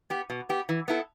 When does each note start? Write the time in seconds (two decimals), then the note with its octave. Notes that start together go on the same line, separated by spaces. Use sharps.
0.10 B3 G4
0.30 B2
0.49 B3 G4
0.69 E3
0.88 B3 E4 A4